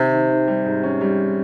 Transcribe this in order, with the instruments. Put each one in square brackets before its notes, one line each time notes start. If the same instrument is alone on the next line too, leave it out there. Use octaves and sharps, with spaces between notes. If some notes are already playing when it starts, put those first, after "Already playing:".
Already playing: [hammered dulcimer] C3 [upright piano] D#3
[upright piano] D#3
D#3
G3
G#2
C#4
G3